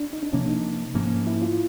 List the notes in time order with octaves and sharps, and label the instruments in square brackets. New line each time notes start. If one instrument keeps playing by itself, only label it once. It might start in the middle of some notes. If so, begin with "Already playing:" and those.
Already playing: [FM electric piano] D4
D#4
D4
[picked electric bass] C3 F3 A#3 [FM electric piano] C#4
[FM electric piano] D#4
[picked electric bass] G#2 F3 A#3 C#4
[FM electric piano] E4
F4